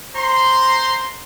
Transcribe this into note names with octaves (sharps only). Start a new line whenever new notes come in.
C5 A#5 C6